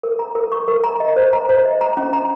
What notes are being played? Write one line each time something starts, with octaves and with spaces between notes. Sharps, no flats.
A#4
A#5
A#4
C#6
A#4
A#5
D#5
C5
A#5
C5
D#5
A#5
C#4
A#5